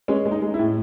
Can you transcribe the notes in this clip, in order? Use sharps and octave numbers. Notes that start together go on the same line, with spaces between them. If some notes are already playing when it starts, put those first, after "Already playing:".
G#3 C#4
G#3
D#4
G#3
E4
A2